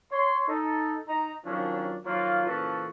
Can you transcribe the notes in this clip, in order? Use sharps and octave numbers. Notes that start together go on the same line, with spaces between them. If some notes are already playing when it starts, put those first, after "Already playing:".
C#5 C6
D#4 A4
D#4 A#5
D#3 F3 F#3 C#4 D4
D#3 F3 F#3 A#3 F4
A#2 C#3 E3 F3 F#4 A4